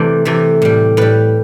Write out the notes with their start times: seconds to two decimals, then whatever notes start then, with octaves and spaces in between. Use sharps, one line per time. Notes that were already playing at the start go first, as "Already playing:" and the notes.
Already playing: C3 E3 A3 C5 D5
0.25 C3 E3 A3
0.62 A2 G3
0.97 A2 G3 B4